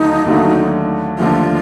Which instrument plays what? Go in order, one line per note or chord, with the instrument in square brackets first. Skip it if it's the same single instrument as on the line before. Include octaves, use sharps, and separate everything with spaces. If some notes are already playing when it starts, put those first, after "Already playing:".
Already playing: [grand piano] D#2 D3 F#3 A3 [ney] D#4
[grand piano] D#2 D3 F#3 A3
[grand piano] D#2 D3 F3 A3 [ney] F4